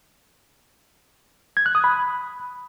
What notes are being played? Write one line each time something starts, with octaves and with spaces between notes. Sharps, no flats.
G#6
F#6
D#6
B5